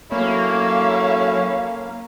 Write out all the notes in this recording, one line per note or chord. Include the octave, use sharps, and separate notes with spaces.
F#3 A#3 C#4 E4 A4 C#5 F5